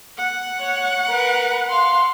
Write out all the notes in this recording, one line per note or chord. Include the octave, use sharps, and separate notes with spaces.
F#5
C#5
A#4 B4
F5 C6